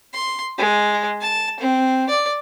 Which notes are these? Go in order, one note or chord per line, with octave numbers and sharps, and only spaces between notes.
C6
G#3
A5
C4
D5